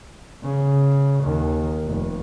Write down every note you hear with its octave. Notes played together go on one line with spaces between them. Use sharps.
C#3
D#2
F1